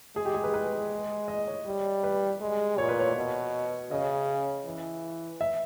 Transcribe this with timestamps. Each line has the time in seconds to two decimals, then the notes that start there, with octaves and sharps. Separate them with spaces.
0.16 G#3 G#4
0.25 G4
0.34 G#4
0.44 B4
0.54 B4
1.28 D#5
1.48 C#5
1.66 G3
2.04 B4
2.41 G#3
2.78 A#2 C#5
2.89 B4
3.00 C#5
3.16 B2
3.91 C#3 D#5
4.66 E3
5.41 E5